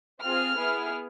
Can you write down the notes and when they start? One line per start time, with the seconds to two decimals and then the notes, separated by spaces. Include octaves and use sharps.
0.21 C4 F4 G#4 F6
0.56 B3 E4 G#4